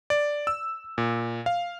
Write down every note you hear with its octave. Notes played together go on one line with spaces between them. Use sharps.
D5
E6
A#2
F5